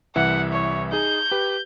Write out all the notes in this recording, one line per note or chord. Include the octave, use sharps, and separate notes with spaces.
C2 E3 E5 F#5
C#5
D#4 G#4 G6
G4 B4